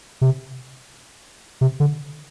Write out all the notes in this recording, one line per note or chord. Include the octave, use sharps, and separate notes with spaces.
C3
C3
D3